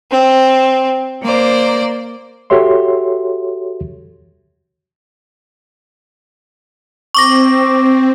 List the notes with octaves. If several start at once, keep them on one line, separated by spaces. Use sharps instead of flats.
C4
A#3 C5 D5
F#4 G4 A4 C#5 E5 C6
C4 C#6 D6 A#6